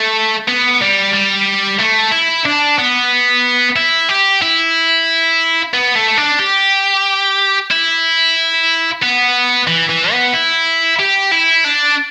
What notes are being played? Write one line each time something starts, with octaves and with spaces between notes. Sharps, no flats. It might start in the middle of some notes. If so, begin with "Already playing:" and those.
Already playing: A3
B3
G3
G3
A3
E4
D4
B3
E4
G4
E4
B3
A3
D4
G4
E4
B3
E3
E3
B3
E4
G4
E4
D4